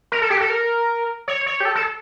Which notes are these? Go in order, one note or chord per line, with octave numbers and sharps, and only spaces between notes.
A#4
A4
G4
A4
A#4
C#5
C#5
G4
A4
A4